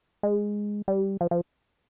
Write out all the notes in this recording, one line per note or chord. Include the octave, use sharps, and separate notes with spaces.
G#3
G3
F3
F3